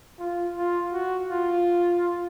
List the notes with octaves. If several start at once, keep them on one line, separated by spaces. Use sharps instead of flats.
F4
F4
F#4
F4